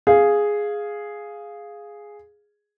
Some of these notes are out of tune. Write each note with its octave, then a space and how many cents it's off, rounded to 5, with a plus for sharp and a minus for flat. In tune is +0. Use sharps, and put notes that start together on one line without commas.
G#4 +0 F5 +0